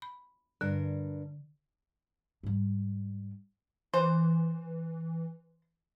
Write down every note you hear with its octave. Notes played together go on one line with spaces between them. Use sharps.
B5
G2 D3 A#4
G#2 G3
E3 C5